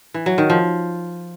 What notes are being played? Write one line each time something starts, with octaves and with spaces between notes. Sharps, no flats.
E3
F#3
D#3
F3